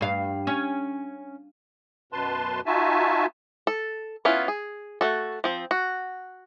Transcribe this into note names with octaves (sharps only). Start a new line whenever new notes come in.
G2 F5
C#4
F#2 B2 B4 A5 C6
D#4 F4 F#4 E5 G#5 A5
A4
B3 C#4 E4 F4
G#4
A3 F#4 A4
F3 C4
F#4